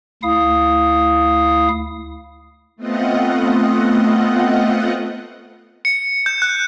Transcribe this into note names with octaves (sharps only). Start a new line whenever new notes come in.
D2 E4 F5 D#6
A3 B3 C4 F4 D#5 F#5
C#7
G6
F#6